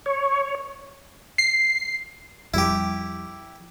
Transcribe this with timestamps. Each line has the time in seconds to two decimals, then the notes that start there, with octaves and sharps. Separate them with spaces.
0.06 C#5
1.38 C7
2.54 F2 G3 E4 G4